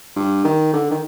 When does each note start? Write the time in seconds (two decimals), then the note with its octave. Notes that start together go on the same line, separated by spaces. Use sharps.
0.16 G2
0.44 D#3
0.73 D3
0.91 D#3